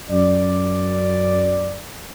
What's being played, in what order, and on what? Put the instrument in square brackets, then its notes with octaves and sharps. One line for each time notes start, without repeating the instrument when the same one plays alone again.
[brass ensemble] F#2 D5